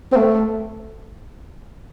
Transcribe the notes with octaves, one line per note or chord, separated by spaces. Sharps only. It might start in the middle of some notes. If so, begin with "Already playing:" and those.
C4
A3